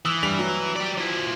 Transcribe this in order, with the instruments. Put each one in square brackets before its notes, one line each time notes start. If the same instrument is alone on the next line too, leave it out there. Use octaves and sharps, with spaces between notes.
[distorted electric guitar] E3 [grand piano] D#6 E6
[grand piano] G2 G3 F7
F#3
[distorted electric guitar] G4 D5
F3 E4